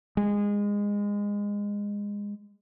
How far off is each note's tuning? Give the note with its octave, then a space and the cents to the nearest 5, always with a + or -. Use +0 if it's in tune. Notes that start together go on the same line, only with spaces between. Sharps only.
G#3 -20